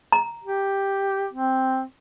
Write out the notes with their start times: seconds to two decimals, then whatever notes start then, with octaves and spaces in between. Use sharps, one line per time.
0.12 A#5
0.44 G4
1.33 C4